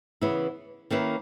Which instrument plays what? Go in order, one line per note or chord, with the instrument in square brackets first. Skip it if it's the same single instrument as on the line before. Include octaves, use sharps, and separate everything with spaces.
[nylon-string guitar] C#3 E3 B3 E4
D#3 A#3 C#4 E4 B4